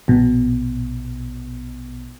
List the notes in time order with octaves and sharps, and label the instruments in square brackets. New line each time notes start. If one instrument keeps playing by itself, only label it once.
[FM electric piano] A#1 B2